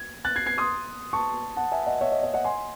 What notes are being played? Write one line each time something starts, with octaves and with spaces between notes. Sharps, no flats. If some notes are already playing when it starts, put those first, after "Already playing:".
Already playing: G#6
F#6 A6
G#6 C7
G#6 C7
C6 D#6
A5 C#6
F#5 A5
E5 G#5
D#5 F#5
C#5 E5
D#5
D#5
D#5 F#5
G#5 C6